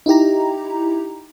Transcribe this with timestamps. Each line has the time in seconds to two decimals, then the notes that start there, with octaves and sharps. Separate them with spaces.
0.06 D#4 E4 G4 A#5